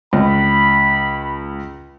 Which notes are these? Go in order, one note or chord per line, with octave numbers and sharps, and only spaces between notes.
C#2 B5